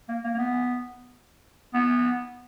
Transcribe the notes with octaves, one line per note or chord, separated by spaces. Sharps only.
A#3
A#3
A#3
B3
B3